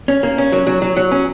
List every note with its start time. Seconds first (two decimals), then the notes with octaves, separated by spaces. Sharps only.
0.08 C#4
0.23 A#3
0.38 C#4
0.52 F#3
0.67 F#3
0.82 F#3
0.97 F#3
1.11 C#4